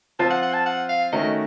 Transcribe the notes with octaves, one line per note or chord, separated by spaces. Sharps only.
F3 C4 F4 C5 A5
F#5
F#5
A5
F#5
F5
D#3 A3 C#4 F#4 A#4 D#5